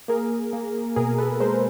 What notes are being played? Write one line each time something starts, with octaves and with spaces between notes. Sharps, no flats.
A#3 G#4 A#4
A#3
B2 G#4 A#4
A4 B4
G#3 A#4 C5